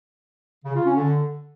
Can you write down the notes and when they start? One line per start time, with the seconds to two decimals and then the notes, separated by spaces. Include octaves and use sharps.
0.65 C#3
0.75 F4
0.85 C#4
0.95 D3